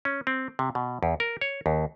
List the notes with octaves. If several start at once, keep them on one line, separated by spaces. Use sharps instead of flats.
C#4
C4
C3
B2
E2
A#4
C#5
D#2